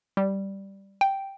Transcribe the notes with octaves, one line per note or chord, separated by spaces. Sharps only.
G3
G5